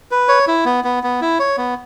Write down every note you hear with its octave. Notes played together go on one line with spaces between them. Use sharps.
B4
C#5
E4
B3
B3
B3
E4
C#5
B3